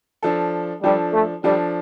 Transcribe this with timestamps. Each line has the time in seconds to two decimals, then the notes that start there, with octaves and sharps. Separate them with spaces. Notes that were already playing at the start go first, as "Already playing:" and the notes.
0.22 F3 D4 A4
0.83 F3 G3 D4 A4
1.13 A3
1.44 F3 G3 D4 A4